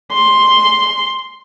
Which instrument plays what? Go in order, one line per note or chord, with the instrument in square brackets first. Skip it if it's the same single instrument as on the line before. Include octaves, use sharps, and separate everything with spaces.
[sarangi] C6